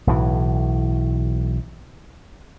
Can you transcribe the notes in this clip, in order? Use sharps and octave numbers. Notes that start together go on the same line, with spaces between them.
B1 A2 E3